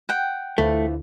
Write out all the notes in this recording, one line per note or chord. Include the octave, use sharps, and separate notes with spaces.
F#5 G5
D2 D3 E3 F3 A3